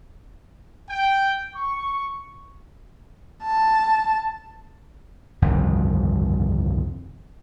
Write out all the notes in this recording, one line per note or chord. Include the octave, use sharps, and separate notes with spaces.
G5
C#6
A5
G1 C2 F2 D#3